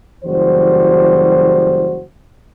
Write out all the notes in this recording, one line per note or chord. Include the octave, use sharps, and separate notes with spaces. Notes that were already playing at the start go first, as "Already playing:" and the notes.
F#1 E3 G3 F#4 C5